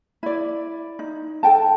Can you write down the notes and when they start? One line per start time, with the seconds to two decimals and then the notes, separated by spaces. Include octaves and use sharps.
0.23 E4 D5
0.99 D#4
1.43 A4 F#5 G5 A5